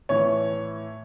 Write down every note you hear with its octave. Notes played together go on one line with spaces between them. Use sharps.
A2 E3 C#5